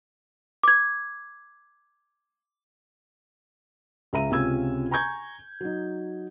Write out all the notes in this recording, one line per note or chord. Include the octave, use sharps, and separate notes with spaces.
D6 G#6
C#2 E5 A#5 D#7
C#2 C3 C#4 F4 E6 G#6
G#5 A#5 C#6 G6 G#6
F#3 D#4